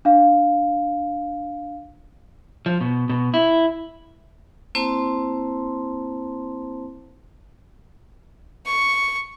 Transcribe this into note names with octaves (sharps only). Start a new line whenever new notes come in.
D4 F5
F3
B2
B2
E4
A#3 C4 E4 C5 A5 C6
C#6